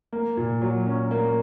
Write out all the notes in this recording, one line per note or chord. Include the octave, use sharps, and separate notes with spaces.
A#3
A#2
F#3
C#4
A#3